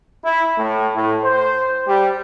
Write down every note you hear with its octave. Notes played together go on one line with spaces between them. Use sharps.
E4
A2
A2
C5
G3